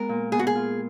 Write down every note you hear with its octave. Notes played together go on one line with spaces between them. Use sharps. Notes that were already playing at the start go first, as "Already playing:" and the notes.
Already playing: G#3 B3 A#4
A#2
B3 G#4
F#4
G#4
F4